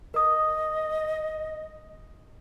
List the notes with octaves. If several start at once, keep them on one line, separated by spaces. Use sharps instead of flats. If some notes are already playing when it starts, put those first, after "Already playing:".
A#4 D#5 D#6